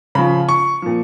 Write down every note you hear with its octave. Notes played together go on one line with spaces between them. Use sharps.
C#3 F3 B5
C#6
A#2 F3